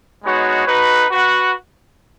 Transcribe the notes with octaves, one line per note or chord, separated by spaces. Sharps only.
G#3 B3 D#4 F#4 C#5
D#4 F#4 B4
F#4 B4 F#5